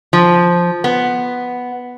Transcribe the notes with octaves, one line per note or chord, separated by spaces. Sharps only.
F3
B3